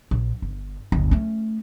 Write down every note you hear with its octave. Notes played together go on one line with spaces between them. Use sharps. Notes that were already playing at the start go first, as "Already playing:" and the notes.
A#1
G1
G1 D2
A3 C#4